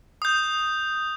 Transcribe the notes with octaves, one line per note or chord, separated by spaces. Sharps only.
D#6 G6